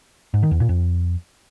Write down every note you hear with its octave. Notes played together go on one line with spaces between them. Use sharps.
G#2
D#3
E2
A#2
F2